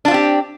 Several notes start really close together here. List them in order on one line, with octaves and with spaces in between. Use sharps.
D4 F4 C4 G4